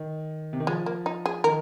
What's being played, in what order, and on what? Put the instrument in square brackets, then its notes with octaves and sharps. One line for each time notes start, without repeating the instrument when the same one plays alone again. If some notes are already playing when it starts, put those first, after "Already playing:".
Already playing: [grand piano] D#3
C3
D#3
[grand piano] F3 [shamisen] G#3
[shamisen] A#3
D#4
G#4
[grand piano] D#3 [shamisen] A#4